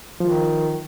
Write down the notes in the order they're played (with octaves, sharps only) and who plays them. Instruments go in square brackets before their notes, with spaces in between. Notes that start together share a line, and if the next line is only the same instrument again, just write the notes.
[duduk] D#3 [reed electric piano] F3